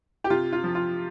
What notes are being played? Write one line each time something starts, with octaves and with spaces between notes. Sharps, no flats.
G4
C3 F4
F4
F3
F4